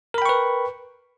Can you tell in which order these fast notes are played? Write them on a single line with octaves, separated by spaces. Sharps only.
A#4 B5 G5 C#6 B4